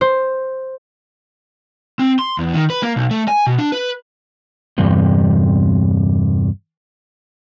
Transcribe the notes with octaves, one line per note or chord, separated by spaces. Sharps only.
C5
C4
C6
E2
D#3
B4
A#3
B1
A3
G#5
B2
D4
B4
E2 G2 C3